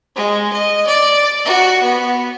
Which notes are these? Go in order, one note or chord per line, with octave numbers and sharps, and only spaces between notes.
G#3
D#5
D5
F#4
B3